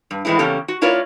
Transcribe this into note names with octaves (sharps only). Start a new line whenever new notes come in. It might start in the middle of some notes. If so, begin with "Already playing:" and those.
G2
A2 E3 G#3 C4 E4
E2 C#3 A#3 C#4 G4 A4
F#4
A3 E4 F4 A#4 C#5 D5